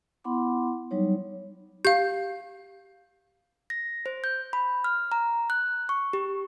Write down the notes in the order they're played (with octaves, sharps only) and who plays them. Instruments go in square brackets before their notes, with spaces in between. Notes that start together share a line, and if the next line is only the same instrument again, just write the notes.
[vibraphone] B3 E4 F#5 B5 C6 D6
F#3 G3 D#4 C#5
[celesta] G4 [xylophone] F5 G6
[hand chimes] A#6
C5
G6
B5
F6
A#5
F#6
C#6
G4